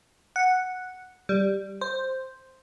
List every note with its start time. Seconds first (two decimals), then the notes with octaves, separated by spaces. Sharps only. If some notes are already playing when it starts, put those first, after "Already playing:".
0.36 F#5
1.29 G3
1.81 C5